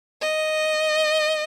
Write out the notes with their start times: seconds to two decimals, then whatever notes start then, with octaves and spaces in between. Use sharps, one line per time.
0.22 D#5